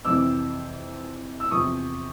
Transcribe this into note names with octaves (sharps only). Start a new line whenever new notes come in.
F2 C3 E3 D6 E6
E6
E2 C3 F3 C#6 D#6